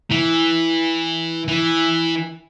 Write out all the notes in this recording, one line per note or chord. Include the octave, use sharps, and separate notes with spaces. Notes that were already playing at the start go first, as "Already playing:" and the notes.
E3
E3